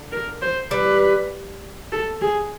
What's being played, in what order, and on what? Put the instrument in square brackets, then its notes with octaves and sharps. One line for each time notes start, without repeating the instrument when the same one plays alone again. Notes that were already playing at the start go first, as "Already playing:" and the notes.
Already playing: [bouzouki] D3
[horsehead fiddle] A#4
C5
[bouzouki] G3 [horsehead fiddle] B4
[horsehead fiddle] A4
G#4